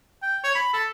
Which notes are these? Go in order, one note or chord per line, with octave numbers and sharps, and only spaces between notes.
G5
C#5
B5
A4